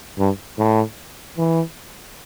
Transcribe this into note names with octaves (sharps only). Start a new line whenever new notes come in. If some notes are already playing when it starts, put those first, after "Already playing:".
G2
A2
E3